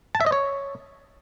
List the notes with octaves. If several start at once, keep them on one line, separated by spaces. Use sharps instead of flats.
A5
E5
D#5
C#5